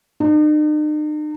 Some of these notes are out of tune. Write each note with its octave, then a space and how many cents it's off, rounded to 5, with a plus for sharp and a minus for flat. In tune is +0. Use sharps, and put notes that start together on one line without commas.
D#4 -45